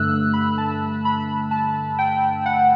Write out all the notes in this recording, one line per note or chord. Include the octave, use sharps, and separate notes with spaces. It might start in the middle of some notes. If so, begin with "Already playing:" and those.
Already playing: G2 D3 A3 E6 F#6
F#6
B5
A5
B5
A5
G5
F#5